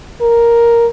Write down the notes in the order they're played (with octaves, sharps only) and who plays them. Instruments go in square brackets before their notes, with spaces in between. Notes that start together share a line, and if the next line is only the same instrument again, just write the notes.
[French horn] A#4